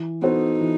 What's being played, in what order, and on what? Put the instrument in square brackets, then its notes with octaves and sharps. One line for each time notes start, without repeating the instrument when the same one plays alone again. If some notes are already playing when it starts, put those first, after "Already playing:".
Already playing: [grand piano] E3
[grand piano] B3 F#4 A4 C5 [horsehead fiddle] D#4
[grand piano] E3